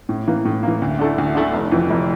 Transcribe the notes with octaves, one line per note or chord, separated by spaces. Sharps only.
A2
E3 A#3
A2
E3 A#3
D2
D3 A3 E4
D2
D3 A3 E4
F1
F2 E3
F1